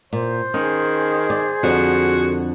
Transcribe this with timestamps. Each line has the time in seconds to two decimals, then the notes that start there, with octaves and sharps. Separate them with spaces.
0.13 A#2 C5
0.54 D#3 C#4 G#4
1.30 D5
1.63 F2 D3 F#4